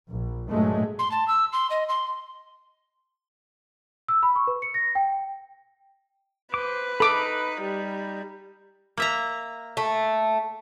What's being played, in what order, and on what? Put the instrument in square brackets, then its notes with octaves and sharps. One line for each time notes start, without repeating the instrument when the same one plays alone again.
[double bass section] A#1
G2 A#2 F#3 G#3 A3
[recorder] C6
A5
E6
C6
D#5
C6
[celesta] E6
B5
C#6
B4
C#7
A#6
G5
[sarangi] B4 [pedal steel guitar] C5 D6
[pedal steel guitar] D#4 B5 [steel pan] A4 D6
[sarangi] G3
[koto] A#3 E5 A#5
[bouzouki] A3